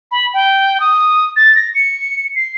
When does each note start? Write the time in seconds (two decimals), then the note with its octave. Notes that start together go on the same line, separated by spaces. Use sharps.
0.11 B5
0.34 G5
0.80 D#6
1.36 A6
1.56 A#6
1.75 C#7
2.36 C7